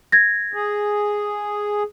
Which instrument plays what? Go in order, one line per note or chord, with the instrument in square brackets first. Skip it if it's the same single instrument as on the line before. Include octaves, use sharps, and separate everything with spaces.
[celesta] G#6 A#6
[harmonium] G#4